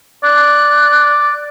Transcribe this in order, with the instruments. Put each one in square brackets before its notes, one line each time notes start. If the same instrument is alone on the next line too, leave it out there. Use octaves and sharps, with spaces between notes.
[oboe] D5 [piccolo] F#6